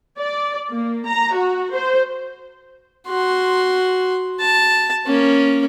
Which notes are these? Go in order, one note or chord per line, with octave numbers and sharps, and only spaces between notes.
D5
A#3
A#5
F#4
C5
F#4 C6
A5
A#3 C#4